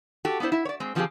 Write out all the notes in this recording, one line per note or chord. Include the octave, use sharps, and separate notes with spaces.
F#4 G4 A4
B3 C4 D4 E4 C5
E4 E5
C#5 D5
G#3 C4
D3 F3 C4 F4 G4 G#4